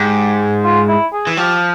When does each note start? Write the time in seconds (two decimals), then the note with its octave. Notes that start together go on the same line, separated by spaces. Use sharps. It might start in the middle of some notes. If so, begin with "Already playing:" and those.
Already playing: G#2 G4
0.64 F4
0.88 E4
1.13 G#4
1.27 E3
1.37 F3 G4